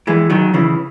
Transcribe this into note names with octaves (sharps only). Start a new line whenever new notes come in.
E3 G#3
D#3 F#3
C#3 E3